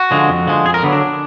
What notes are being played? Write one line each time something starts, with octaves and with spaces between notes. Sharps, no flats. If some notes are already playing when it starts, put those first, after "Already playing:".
Already playing: F#4
D3 F3 G#3
F2
D3 F3 G#3
F2 G#4
A#4
D3 F#3 B3
D4